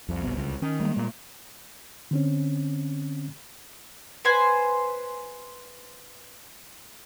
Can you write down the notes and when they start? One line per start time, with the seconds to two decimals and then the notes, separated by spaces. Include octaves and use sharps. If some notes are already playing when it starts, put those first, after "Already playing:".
0.09 C2 F2
0.23 G1 B2
0.37 C#2
0.62 D#3 C#4
0.80 G3 G#3 A#3
0.97 A#2
2.11 D3 C4 C#4
4.25 B4 C5 G#5